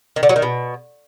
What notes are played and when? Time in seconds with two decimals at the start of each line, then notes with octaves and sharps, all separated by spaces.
0.16 D#3
0.23 D3
0.29 F#3
0.36 D#3
0.42 B2